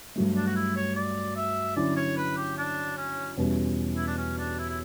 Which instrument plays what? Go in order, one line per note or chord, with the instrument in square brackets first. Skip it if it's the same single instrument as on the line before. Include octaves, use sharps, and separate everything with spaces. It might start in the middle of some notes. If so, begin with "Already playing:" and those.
[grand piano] G2 F#3 A3
[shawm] D4
F#4
E4
C#5
D5
E5
[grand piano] D3 F#3 C#4 E4 [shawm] D5
[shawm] C#5
B4
G4
D4
C#4
[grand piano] E2 B2 G3 C#4
[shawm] E4
D4
C#4
D4
E4
E4